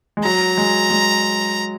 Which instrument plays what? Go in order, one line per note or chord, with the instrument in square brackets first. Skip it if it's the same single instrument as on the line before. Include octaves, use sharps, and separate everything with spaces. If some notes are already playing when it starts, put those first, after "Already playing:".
[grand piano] G#3
[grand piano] F#3 [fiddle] A#5
[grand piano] G#3
G#3